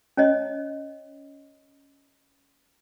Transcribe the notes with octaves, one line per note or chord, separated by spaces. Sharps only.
C#4 C#5 D#5